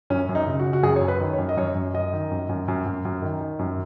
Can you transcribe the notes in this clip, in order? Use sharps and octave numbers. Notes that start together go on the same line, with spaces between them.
F#2 C#4
F#2
D#4
C#3
F#4
C#3
F#4
F#2 G#4
C#5
F#2
B4
D#3
C#5
F#2
D#5
F#2 C#5
F#2
F#2 D#5
D#3
F#2
F#2
F#2
F#2
F#2
D#3
D#3
F#2